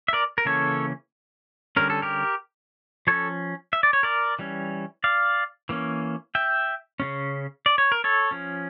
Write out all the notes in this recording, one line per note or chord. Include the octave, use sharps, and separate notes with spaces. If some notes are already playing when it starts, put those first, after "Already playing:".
E5
A#4 D5
A#4
C#3 E3 A#3 C#4 A4 C#5
D3 G3 C#4 A#4
A4
G4 A#4
F3 C#4 A4 C#5
E5
D5
C#5
A#4 D5
E3 G3 C#4
D5 F5
E3 A#3 C#4
E5 G5
C#3 G3 C#4
D5
C#5
A#4
A4 C#5
F3 C#4